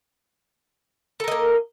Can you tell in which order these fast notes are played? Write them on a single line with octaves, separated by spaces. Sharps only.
A4 A#4 D#5 A#3